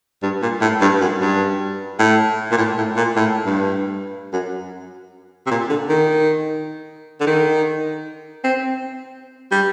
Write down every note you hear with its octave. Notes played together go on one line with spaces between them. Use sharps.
G2
A#2
A2
G2
F#2
G2
A2
A#2
A2
A2
A#2
A2
G2
F#2
C3
A#2
D3
D#3
D3
D#3
C4
G3